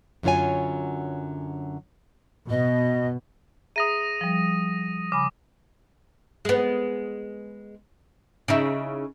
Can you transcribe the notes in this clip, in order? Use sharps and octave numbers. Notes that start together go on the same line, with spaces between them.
F#2 D3 F#3 F4 C#5 G#5
B2 D#5
G#4 E5 A#5 D#6 A#6 D#7
F3 G3
C#3 G#5 B5 D6
G#3 B3
C#3 D#4 E4